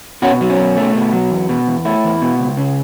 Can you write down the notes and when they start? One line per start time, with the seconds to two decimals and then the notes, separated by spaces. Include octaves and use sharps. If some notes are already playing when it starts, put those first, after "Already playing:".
0.22 B2 C#4 F#4
0.41 F#3
0.50 C#4
0.59 B2
0.77 A3
0.95 B2
1.13 F#3
1.31 E2
1.49 B2
1.67 E2
1.85 A3 E4
2.04 E2
2.22 B2
2.39 C#2
2.57 C#3